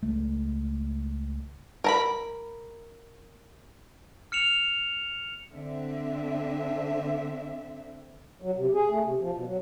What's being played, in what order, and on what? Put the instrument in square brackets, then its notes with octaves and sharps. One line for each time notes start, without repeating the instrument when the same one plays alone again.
[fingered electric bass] C#2 G#3 A3
[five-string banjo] A#4 A#5 B5
[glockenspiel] F6 C#7 E7 F7
[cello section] D3 C4 E5
[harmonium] F#3
C3
G#4
A3
C3
F3
B2
F#3